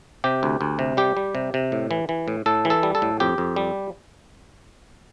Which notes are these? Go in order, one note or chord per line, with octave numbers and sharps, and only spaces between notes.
C3 G4
D2
D2
C3
G3 G4
G3
C3
C3
A2
E3
E3
A2
A2 A4
E3
A4
G3
A4
A2
F2 G4
F2
G3